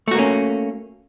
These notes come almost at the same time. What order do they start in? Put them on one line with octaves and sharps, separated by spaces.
A3 F#4 A#3 C#4